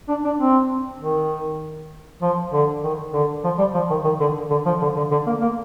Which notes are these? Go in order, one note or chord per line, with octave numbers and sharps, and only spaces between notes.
D4
D4
C4
D#3
F3
D3
D#3
D3
F3
G3
F3
D#3
D#3
D3
D3
F3
D3
D3
D3
A#3
A#3